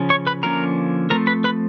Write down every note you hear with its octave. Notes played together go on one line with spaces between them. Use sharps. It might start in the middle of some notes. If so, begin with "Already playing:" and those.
Already playing: C#3 F3 C#4
C#5 C#6
B4 B5
D3 F3 A#3 C#4 A#4 A#5
F3 A3 C4 A#4 A#5
B4 B5
B4 B5